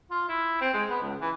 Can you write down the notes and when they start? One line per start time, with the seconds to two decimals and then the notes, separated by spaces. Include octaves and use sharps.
0.11 F4
0.29 E4
0.61 C4
0.73 G#3
0.89 B3
1.02 C#2
1.21 E3